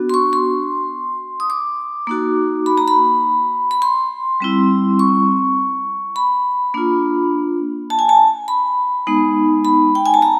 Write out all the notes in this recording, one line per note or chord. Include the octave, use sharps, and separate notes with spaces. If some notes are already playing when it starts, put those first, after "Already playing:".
Already playing: B3 D4 F#4
C6
C#6
C6
D#6
D6
A#3 D#4 F#4
B5
A#5
B5
B5
C6
G3 C4 E4
C#6
B5
A#3 D4 F4
A5
G#5
A5
B5
G#3 B3 D#4
B5
G5
G#5
A5
A#5